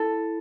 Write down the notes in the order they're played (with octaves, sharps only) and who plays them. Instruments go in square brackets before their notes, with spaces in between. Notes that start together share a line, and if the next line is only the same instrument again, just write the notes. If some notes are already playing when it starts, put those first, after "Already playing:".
Already playing: [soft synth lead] E4 [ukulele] A4